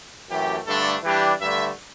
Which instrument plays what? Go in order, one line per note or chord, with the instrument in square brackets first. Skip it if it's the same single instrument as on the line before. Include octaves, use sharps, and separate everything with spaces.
[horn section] F#2 E3 A3 G4
G2 D3 A3 D4 A4
E3 G3 D4 G4
G2 D3 A3 E5